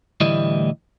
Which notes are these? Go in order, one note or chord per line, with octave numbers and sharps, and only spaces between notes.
D2 A2 E3 G3 E4 D#5